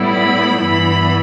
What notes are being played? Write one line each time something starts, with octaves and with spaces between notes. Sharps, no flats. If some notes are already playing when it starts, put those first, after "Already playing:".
Already playing: A2 G3 B3 E4
B5
G2 E3 B3 E4 B5